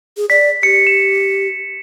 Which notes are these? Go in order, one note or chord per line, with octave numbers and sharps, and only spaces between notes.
G#4
D5 B6
G4 C#7
E7